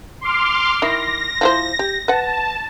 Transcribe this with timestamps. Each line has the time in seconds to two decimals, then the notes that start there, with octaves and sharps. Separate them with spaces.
0.21 C6 D6 F6
0.82 D#3 E4 A#6
1.41 F3 E4 C5
1.79 G4
2.08 B4 F#5 A5